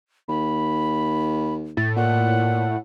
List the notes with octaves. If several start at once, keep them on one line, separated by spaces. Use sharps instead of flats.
D#2 B5
A2 A6
A#2 F#5